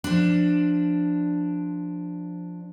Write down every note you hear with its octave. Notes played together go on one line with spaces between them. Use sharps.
F3 D4